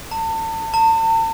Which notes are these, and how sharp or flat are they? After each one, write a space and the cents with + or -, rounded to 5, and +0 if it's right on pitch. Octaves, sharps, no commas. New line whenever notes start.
A5 +35
A5 +40